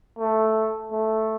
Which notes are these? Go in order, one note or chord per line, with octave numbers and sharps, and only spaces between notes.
A3
A3